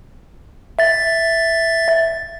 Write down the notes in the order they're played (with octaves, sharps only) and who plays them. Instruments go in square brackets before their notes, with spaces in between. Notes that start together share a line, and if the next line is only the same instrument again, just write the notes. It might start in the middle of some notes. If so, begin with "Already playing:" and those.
[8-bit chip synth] E5 A6